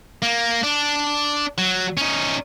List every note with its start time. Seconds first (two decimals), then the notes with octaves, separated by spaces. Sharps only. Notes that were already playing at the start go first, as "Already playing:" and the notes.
0.22 A#3
0.63 D4
1.58 F#3
1.97 C#4 D#4